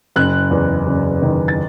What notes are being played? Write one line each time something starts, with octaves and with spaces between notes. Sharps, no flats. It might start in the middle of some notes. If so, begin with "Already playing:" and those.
F#1 F#6
E2
F#1
D#3
A6